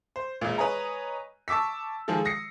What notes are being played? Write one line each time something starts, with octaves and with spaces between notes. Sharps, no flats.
C5
E1 A#2
B4 C#5 D#5 G#5 A#5
A5 C#6 D6 E6 B6
D#3 F3 G#3 G#4 A4
D#6 A#6 C7 C#7